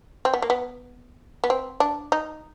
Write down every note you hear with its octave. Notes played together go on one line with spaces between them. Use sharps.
C4
B3
A#3
B3
B3
C4
D4
D#4